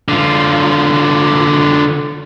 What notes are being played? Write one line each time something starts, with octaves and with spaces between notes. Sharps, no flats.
D3 F4